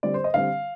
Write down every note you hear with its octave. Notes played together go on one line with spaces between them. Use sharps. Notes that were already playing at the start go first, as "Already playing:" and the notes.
D3 G3 C4 D5
C5
D#5
D3 G3 C4 F5